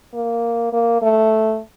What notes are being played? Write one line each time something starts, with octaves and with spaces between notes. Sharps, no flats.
A#3
A#3
A3